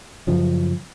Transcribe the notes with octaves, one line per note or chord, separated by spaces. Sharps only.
F#2 C#3 F3